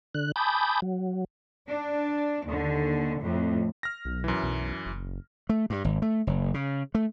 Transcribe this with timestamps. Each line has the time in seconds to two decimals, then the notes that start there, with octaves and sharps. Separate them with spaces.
0.15 D3 F#6
0.36 G#5 A5 B5 D6 D#6 G6
0.82 F#3
1.69 D4
2.47 D#2 D3
3.20 F2 A2
3.83 F6 A#6
4.05 B1
4.24 F#2 E3
4.43 B1
4.86 F#1
5.49 A3
5.70 G2
5.84 G#1
6.02 A3
6.27 F#1
6.54 C#3
6.95 A3